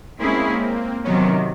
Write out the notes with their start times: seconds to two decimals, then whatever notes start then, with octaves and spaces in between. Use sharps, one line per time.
0.19 G#3 A#3 C4 C#4 E4 G#4
1.04 C3 D#3 F#3 B3 C#4